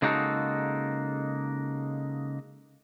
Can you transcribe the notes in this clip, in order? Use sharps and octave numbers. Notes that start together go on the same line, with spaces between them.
C#3 G#3 A#3 D#4 F#4 A4